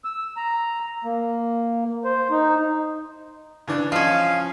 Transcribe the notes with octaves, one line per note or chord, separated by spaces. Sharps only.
E6
A#5
A#3
C5
D#4
C#3 E3 D4
F3 C#4 D#5 F5